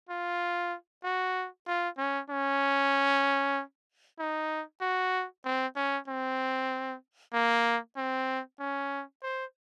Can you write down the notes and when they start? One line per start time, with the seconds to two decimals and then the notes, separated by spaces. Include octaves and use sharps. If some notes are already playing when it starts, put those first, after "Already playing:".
0.09 F4
1.04 F#4
1.67 F4
1.98 C#4
2.30 C#4
4.19 D#4
4.81 F#4
5.45 C4
5.76 C#4
6.08 C4
7.34 A#3
7.97 C4
8.60 C#4
9.23 C5